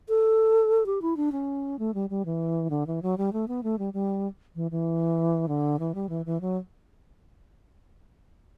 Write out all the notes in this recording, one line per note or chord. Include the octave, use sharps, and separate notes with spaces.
A4
G4
E4
D4
C#4
A3
G3
G3
E3
D3
E3
F#3
G3
A3
B3
A3
G3
G3
E3
E3
D3
E3
G3
E3
E3
F#3